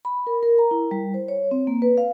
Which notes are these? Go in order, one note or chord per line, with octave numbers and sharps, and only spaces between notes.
B5
A#4
A#4
A#5
E4
G3
C5
C#5
C4
A#3
B4
F5